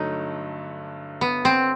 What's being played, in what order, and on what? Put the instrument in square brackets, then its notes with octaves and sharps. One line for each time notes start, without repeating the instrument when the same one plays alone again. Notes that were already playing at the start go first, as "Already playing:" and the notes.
Already playing: [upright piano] G2 D3 F#3 A3 [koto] D#4
[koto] B3
C4